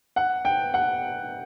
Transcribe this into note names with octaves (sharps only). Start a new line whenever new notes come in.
F#5
G5
F#5